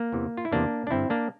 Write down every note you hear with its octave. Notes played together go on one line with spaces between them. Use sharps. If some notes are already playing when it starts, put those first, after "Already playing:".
Already playing: A#3
E2 C3 E3
F4
E4
E2 C3 E3 A#3 D4
D4
G2 D3 C4 E4
A#3 D4